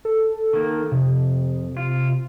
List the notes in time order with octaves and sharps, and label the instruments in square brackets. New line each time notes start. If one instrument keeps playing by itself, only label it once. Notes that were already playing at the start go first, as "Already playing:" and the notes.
[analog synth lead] A4
[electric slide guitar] D#3 A#3
[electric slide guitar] F2 [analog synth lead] C3
[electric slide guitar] F4